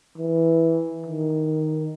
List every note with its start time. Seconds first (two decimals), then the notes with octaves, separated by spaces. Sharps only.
0.18 E3
1.06 D#3